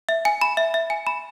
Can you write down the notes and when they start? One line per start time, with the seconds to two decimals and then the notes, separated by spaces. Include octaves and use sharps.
0.09 E5
0.25 G#5
0.41 B5
0.57 E5
0.74 E5
0.90 G#5
1.07 B5